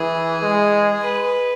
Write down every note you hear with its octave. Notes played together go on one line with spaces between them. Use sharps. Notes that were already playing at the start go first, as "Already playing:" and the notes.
Already playing: E3 G#4
G#3
B4